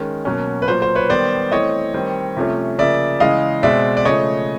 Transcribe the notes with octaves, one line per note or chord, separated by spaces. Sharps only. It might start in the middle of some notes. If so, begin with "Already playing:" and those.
Already playing: D#3 G#3 C#4
B2 F#3 A#3 C#4
B4
A#2 F#3 A#3 C5
C5
B4 C#5
D#3 G3 B3 C5 D5
E3 A3 C4 C#5 D#5
D#3 G3 C4
C3 F3 A3 C#4
C#3 F3 A#3 D5 E5
C#3 E3 G#3 D#5 F5
B2 G#3 C4 D5 E5
D5
C#3 F3 A3 C#5 D#5